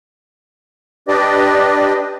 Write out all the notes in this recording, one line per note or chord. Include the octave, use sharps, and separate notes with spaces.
D4 G4 B4 D5 D#5